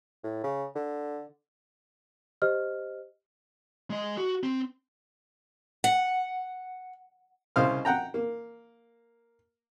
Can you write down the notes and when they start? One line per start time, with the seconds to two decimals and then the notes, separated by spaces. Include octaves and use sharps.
0.24 A2
0.44 C#3
0.75 D3
2.42 G4 C5 D#5 F6
3.90 G#3 D#5
4.18 F#4
4.43 C4
5.84 F#5
7.56 C2 C#3 C5 D#5 F5 F6
7.85 F#5 G5 A#5
8.14 A#3